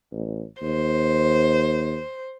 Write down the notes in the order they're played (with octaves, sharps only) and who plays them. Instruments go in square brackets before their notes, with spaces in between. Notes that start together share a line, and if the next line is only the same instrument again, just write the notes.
[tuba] A1
[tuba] D#2 [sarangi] C5